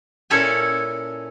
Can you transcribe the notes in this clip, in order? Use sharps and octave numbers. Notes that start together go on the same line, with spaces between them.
A#2 C#4 E4 A4 C#5 G#5